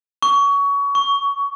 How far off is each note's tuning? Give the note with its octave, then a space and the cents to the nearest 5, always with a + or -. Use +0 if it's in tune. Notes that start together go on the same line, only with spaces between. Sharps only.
C#6 +25
C#6 +15